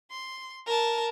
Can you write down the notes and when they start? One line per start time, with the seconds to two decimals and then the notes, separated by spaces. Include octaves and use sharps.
0.11 C6
0.66 A#4 A5